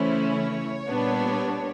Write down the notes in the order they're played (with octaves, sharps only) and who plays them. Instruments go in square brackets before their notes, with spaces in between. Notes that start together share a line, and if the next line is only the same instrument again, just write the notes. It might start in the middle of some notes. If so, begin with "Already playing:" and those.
Already playing: [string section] C#3 E3 A3 C#4 E4 C5
C#5
A#2 G3 B3 D4